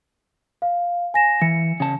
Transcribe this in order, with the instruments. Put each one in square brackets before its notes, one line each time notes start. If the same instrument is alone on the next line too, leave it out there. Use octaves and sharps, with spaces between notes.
[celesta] F5
G#5 A#6 E7
[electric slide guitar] E3 [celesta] C#7
[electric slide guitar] C#3 A5